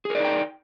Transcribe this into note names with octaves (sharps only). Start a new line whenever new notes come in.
D#4 G#4 A#4 D5 G5